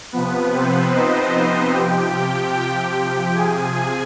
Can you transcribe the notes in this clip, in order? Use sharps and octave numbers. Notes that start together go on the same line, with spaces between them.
C3 F3 B3 B4
C4 C5
D#4 D#5
C3 F3 G4 G5
C3 F3 G#4 G#5